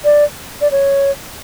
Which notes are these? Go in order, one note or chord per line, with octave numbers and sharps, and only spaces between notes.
D5
D5
C#5